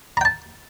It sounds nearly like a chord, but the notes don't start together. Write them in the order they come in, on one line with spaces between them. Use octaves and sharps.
A#5 G5 A5